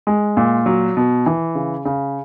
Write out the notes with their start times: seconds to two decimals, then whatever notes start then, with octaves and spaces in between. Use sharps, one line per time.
0.07 G#3
0.37 A#2
0.66 F#3
0.97 B2
1.26 E3
1.55 C#3
1.85 C#3